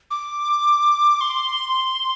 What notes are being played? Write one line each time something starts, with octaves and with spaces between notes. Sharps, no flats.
D6
C6